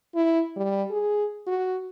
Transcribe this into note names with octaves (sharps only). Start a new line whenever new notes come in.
E4
G3
G#4
F#4